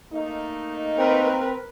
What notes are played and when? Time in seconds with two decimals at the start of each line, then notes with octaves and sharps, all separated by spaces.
0.12 A3 A#3 D#4
0.98 C4 A#4 B4